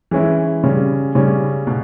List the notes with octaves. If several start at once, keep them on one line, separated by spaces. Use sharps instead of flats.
E3 G#3 C#4 E4
C#3 G3 C#4
C#3 G3 C#4
B2